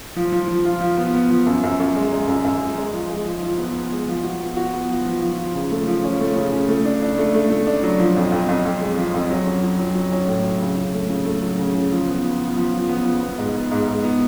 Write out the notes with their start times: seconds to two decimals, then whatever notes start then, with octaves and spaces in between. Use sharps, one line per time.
0.16 F3
0.32 F3
0.48 F3
0.65 F4
0.81 F3
0.98 B3
1.14 B3
1.30 F3
1.46 F#2
1.63 F#2
1.80 F#2
1.96 G#3
2.12 G#3
2.28 F#2
2.44 F#2
2.60 G#3
2.77 G#3
2.93 F3
3.10 G#3
3.26 F3
3.43 F3
3.58 B3
3.74 B3
3.92 G#3
4.08 F3
4.23 F#4
4.40 B3
4.56 F#4
4.73 B3
4.90 F3
5.05 F3
5.22 F3
5.38 F3
5.55 C#3
5.71 A3
5.87 F3
6.04 C#4
6.20 A3
6.36 C#3
6.52 C#3
6.68 A3
6.85 D4
7.01 D4
7.18 A3
7.34 A3
7.50 A3
7.67 D4
7.83 F#3
7.99 F3
8.16 F2
8.32 F2
8.49 F2
8.65 F2
8.81 G#3
8.97 F3
9.14 F2
9.30 F#3
9.46 C#4
9.63 F#3
9.79 F#3
9.95 F#3
10.12 C#4
10.28 A2
10.44 F#3
10.61 C#3
10.77 C#3
10.94 A3
11.10 C#3
11.25 A3
11.42 F#3
11.59 C#3
11.75 C#3
11.91 F3
12.08 B3
12.24 F3
12.40 B3
12.56 F3
12.73 F3
12.89 B3
13.05 F3
13.22 B3
13.38 G#2
13.55 B3
13.71 G#2
13.87 G#2
14.04 B3